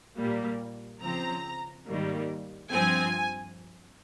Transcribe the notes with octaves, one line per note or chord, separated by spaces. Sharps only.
A#2 G3 A#3
C#3 F3 C4 A#5
G#2 D#3 G3 A#3
G2 F3 C4 G#5